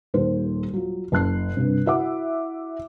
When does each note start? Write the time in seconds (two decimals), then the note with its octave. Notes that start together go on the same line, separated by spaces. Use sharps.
0.14 D#1 D#2 C5
0.73 F#3 F4
1.12 F#1 A5 F#6 C7
1.57 G2 C3
1.86 E4 F#4 E5 F#5 D6